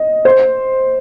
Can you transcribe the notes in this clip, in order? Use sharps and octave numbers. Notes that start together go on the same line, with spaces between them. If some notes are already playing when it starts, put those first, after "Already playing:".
Already playing: D#5
C5